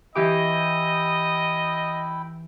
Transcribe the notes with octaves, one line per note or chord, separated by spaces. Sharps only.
E3 E4 G4 D#5 G5 D6